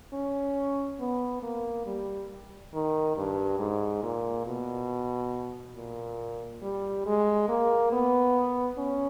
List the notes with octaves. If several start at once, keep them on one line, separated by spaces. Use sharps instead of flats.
C#4
B3
A#3
G3
D#3
G2
G#2
A#2
B2
A#2
G3
G#3
A#3
B3
C#4